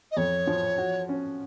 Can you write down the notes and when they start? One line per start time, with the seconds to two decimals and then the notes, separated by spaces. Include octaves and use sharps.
0.11 D#5
0.17 F2 C#5
0.47 F3
0.78 F#4
1.09 C#4